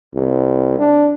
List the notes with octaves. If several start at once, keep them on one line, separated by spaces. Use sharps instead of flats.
C2
D4